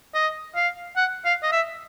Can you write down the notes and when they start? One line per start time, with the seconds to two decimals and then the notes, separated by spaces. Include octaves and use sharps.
0.14 D#5
0.55 F5
0.97 F#5
1.25 F5
1.43 D#5
1.52 E5